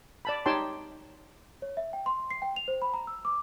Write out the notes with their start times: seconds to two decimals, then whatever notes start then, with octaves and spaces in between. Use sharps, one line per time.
0.25 D5 A5 B5
0.46 D#4 G4 C#5 G5 A5 C6
1.62 C#5
1.77 E5
1.93 G5
2.06 C6
2.30 C7
2.42 G5
2.56 F7
2.68 C5
2.82 B5
2.94 A#5
3.07 E6
3.25 D6